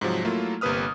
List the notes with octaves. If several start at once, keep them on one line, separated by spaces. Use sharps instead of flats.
G#2 C3 F3 F#3
F#3 A3 A#3 E4 F4
G1 C3 A#3 B4 D#6 F6